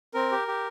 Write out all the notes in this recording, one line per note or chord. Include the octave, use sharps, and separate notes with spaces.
C4 A#4
G4
G4